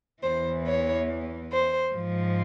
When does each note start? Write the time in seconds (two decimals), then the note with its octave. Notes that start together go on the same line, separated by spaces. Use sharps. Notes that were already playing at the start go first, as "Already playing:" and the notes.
0.22 E2 E3 C5
0.66 C#5
1.51 C5
1.94 G#2 F3